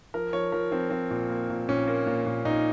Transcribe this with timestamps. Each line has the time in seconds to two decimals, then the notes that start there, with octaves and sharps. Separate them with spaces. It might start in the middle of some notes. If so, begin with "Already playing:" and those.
0.14 F3 A#4
0.33 F3 C#5
0.52 F3 A#4
0.72 F3 C4
0.90 F3 C4
1.11 A#2
1.29 A#3
1.50 A#2
1.68 A#2 C#4
1.88 A#3
2.06 A#2
2.26 A#2
2.45 A#2 D#4